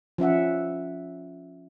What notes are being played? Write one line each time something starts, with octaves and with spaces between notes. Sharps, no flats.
F3 C#4 E5 F#5